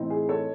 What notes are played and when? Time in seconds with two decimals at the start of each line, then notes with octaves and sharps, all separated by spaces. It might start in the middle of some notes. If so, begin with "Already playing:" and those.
Already playing: A2 E3 C4 D#4
0.10 G#4
0.29 A4 C#5